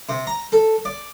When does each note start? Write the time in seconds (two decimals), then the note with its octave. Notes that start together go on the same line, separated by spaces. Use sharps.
0.09 C3
0.27 A#5
0.52 A4
0.85 D5